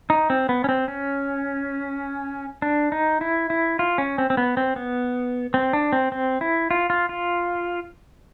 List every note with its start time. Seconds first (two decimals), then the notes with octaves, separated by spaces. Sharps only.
0.10 D#4
0.30 C4
0.49 B3
0.64 C#4
0.69 C4
0.88 C#4
2.62 D4
2.92 D#4
3.21 E4
3.50 E4
3.79 F4
3.98 C#4
4.18 C4
4.30 C4
4.37 B3
4.57 C4
4.76 B3
5.54 C4
5.73 D4
5.93 C4
6.12 C4
6.41 E4
6.71 F4
6.90 F4
7.09 F4